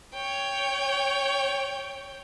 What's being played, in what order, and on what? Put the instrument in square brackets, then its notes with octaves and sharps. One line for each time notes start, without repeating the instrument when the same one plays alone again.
[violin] C#5 G5